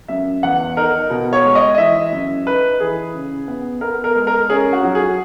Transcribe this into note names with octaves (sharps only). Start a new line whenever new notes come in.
F#2 E5
E2 F#5
D#4 A#4
B2
C#5
G#3
D#5
D#5
E3 E5
F#2
D#4 B4
E3 G#4
C#3
B3
B3 A#4
A#4
G#3
A#4
C#4 G#4
F#4
F#3
G#4